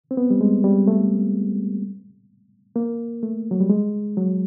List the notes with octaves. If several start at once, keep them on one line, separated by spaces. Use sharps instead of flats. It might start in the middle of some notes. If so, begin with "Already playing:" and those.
C4
B3
G3
G#3
G3
A3
A#3
A3
F#3
G3
G#3
F#3